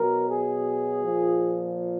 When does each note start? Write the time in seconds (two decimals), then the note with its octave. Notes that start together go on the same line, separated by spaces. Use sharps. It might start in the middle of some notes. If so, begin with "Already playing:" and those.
Already playing: B2 F#3 A#4
0.29 G#4
1.03 A#2 F3